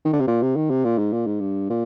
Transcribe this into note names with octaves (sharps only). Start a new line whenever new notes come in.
D#3
D3
C3
A#2
C3
D#3
C3
A#2
G#2
A#2
G#2
G2
A#2